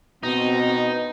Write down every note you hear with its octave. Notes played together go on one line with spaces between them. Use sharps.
B2 C4 D#4